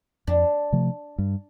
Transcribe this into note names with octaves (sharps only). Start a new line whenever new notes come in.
F2 D4
C3 F3 A3
G2